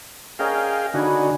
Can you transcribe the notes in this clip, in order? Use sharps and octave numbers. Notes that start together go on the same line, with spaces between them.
C#4 G#4 A#4 D#5 F5 G5
D3 D4 D#4 F#4 G#5 B5